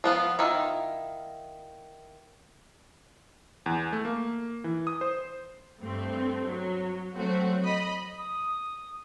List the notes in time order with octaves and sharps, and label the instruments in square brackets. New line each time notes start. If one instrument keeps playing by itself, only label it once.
[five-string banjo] F3 B3 F4
D#3 E4 F4
[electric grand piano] E2
A3
A#3
E3
D#6
C5
[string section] G2 A3 C4
F#3
F#3 A3 C4 F#4
D#5 B5
[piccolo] D#6